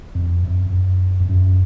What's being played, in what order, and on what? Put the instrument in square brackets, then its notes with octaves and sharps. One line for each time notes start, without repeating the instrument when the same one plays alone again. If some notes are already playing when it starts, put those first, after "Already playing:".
[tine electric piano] F2
F#2
F2
F#2
F2
F#2